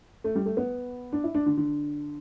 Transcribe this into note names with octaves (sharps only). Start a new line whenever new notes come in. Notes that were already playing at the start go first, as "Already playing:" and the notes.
A3
G3
A3
B3
D4
E4
D4
D3
D3